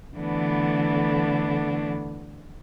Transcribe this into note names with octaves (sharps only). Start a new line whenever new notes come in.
D3 E3 A3 B3 D4